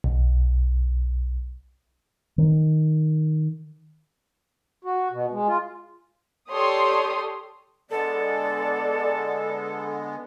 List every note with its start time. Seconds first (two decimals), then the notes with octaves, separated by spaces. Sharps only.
0.04 B1
2.38 D#3
4.85 F#4
5.12 B2
5.31 G#3
5.48 F4
6.51 G4 A4 C#5 D5 C6 D#6
7.91 D3 G#3 B3 A4 D5